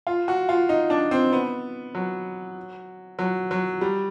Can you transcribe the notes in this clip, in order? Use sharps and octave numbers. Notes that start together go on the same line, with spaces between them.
F4
F#4
F4
D#4
D4
C4
B3
F#3
F#3
F#3
G3